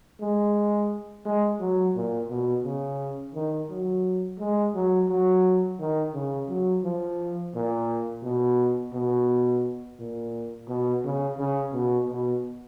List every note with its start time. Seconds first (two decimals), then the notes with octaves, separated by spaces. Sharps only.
0.21 G#3
1.25 G#3
1.60 F#3
1.95 A#2
2.30 B2
2.64 C#3
3.34 D#3
3.70 F#3
4.39 G#3
4.75 F#3
5.09 F#3
5.79 D#3
6.14 C#3
6.49 F#3
6.84 F3
7.55 A#2
8.23 B2
8.94 B2
9.99 A#2
10.68 B2
11.04 C#3
11.39 C#3
11.73 B2
12.09 B2